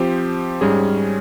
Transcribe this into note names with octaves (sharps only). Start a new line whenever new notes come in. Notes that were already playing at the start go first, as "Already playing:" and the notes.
Already playing: F3 C4 G4 C5
G#2 G3 C#4 G#4